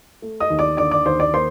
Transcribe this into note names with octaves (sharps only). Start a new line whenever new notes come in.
A3
D#5 D#6
D#2
D5 D6
D3 D5 D6
D5 D6
D#2 C5 C6
D5 D6
A#3 C5 C6